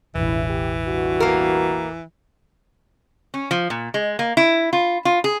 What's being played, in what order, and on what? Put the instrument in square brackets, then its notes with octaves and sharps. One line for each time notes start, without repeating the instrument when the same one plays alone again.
[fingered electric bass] E1 A1 [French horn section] G2 C#3 E4 [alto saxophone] E3
[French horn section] G4
G2 B2 F#4
[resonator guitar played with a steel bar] A#3 A#4
C#4
F3
A#2
G#3
A#3
E4
F4
F4
G#4